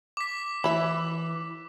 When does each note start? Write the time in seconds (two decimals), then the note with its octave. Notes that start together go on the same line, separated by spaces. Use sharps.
0.17 D6 B6
0.64 E3 E4 E5